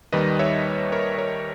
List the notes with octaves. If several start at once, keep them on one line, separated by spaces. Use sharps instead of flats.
D#2 D#3 G3 B4 D#5
C#5 E5
A#4 C#5
A#4 C#5